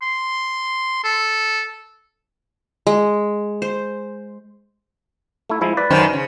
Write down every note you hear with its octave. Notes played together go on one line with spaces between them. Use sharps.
C6
A4
G#3
C5
A3 E4
F3 G#3 E4
B4 D5
F#2 D#3 C5
C#3